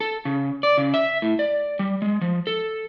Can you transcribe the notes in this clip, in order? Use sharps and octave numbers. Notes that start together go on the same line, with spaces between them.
A4
C#3
D5
C#3
E5
A2
D5
G3
G#3
F3
A4